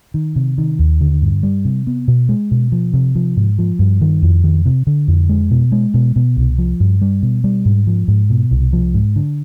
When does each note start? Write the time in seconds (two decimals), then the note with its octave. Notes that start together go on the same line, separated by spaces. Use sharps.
0.14 D#3
0.36 C3
0.58 D#3
0.79 D#2
1.01 D3
1.22 G2
1.43 G3
1.65 C3
1.87 B3
2.08 B2
2.29 G#3
2.51 B2
2.72 F3
2.93 C3
3.15 F3
3.37 G#2
3.59 F3
3.79 G2
4.01 D#3
4.22 F2
4.44 D#3
4.66 C3
4.87 D3
5.08 F2
5.29 G#3
5.51 B2
5.72 G#3
5.94 B2
6.16 B2
6.37 C2
6.58 F3
6.80 G2
7.01 G3
7.23 B2
7.44 G3
7.65 G#2
7.87 F3
8.08 G#2
8.30 B2
8.51 C2
8.73 F3
8.94 G#2
9.16 D3